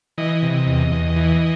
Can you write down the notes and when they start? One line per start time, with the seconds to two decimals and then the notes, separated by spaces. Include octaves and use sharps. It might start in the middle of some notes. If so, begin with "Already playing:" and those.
0.18 E3 D#5
0.42 C3
0.67 E2
0.92 E2
1.16 E3